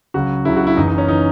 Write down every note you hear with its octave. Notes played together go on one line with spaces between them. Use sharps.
C#2 C#3 F#3 F#4
C#2 C#3 F#3 E4
F#4
E4
F#1 F#2 E3 D#4
D#4
C#4
E3 D#4